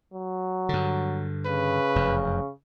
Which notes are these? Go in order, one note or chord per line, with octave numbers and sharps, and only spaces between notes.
F#3
G2 D3
C#3 B4
F1 F#2